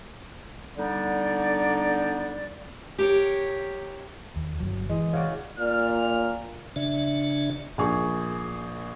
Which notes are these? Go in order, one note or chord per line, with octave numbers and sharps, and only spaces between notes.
D3 G3 B3 D4 D#4 D5
G4 A#4 C#5
D#2
G1 C2 F#3
E3 G#3
C#3 F#4 D5
A#2 D5 F6
C#3 D4 D5 E5
A#1 G#4 C#6